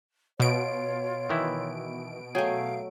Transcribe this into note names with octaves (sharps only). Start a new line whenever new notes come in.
B2 F4 C#5 D7
D#3 E3 E4
F#3 A3 G#4 F5 G5 G#5